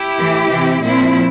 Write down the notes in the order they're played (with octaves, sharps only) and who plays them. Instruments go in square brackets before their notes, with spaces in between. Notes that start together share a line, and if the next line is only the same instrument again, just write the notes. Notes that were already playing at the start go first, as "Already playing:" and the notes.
Already playing: [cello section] E4 G4
A2 E3
C3 E3
A#2 F3 C4 E4